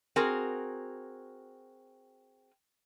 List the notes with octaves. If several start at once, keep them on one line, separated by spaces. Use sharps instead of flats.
C4 F#4 G#4 A#4